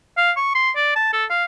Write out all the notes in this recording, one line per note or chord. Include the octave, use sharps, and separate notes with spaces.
F5
C#6
C6
D5
A5
A4
F5